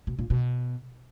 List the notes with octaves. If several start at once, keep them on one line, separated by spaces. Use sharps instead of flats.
B2
A#2
B2